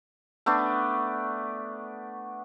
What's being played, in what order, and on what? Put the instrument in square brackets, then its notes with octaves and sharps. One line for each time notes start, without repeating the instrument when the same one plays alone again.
[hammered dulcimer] A3 B3 D4